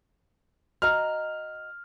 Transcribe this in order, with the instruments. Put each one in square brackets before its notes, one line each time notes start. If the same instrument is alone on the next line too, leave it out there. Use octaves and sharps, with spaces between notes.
[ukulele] F#4 D#5 A#5 [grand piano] F6